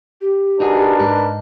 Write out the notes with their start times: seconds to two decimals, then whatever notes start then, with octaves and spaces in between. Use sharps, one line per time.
0.21 G4
0.60 D4 D#4 F#4 G#4 A#4 B4
0.99 G#2 D#4